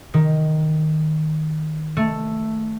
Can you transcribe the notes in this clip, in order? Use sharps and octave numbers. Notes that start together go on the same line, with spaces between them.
D#3
A3